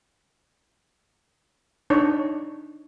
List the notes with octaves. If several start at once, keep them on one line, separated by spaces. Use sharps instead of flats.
D4 D#4 C#5